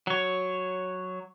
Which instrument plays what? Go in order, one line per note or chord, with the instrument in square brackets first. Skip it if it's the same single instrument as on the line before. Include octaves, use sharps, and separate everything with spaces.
[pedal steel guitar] F#3 C#5